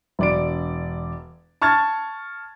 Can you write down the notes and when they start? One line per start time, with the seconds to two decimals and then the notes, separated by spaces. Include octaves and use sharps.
0.19 E1 D5 D7
1.62 A5 C#6 F6 G#6 A6